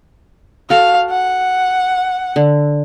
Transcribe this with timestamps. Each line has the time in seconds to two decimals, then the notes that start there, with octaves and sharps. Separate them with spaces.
0.70 F#4 A4 F5
1.11 F#5
2.36 D3